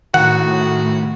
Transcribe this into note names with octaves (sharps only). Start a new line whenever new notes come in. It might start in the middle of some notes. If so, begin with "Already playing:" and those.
A2 D#3 F#4 F#5